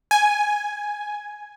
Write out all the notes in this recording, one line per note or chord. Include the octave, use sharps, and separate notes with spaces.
G#5